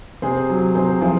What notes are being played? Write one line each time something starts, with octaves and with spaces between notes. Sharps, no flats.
C3 G#4 C5
F#3
C3 G#4 C5
F3 G#4 C5